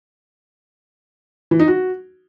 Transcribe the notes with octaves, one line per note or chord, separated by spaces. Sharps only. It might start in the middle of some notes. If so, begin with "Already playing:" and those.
E3
D#4
F#4